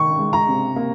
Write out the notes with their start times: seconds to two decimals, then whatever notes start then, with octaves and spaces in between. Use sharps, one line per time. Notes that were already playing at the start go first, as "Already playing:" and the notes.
Already playing: D#3 C#6
0.19 G#3
0.33 A#5
0.48 C3
0.76 A#3